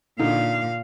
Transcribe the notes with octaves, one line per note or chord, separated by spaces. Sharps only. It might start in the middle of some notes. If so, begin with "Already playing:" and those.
A#2 D3 D#4 F5